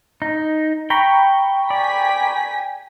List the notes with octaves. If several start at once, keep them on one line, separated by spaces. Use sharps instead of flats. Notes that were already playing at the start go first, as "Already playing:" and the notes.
D#4
G5 A#5 B5 C#6
D5 G5 G#5 B6